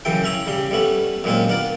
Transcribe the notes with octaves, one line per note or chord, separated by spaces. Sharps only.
F#2 C#3 E3 G5
C#4 E4 A#5 D#6
C#3 G3 C6
G3 A3 B3 C#4
F#2 A#2 G#3 A#3 C4
B3 D4 F4 A#4